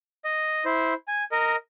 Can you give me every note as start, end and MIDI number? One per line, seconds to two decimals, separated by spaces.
0.25 0.64 75
0.65 0.94 64
0.65 0.94 72
1.08 1.24 80
1.32 1.56 70
1.32 1.56 75